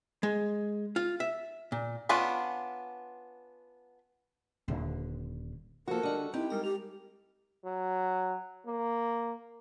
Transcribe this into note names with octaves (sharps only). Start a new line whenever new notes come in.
G#3
F4
E5
A#2
B3 C#4 D4 F4 B5
D#1 D3
F3 G3 A#3 F#4 A4 A#4
D3 G3 D4 D#5 F#5
C4 D#4 E4 G4
G3 G#3 A#4 A#5
G4 F7
F#3
A#3